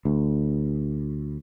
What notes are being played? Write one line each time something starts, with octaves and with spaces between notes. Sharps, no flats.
D2